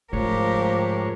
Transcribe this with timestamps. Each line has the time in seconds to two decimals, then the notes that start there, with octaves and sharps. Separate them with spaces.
0.13 G#2 D3 F3 A3 G4 A#4 C#5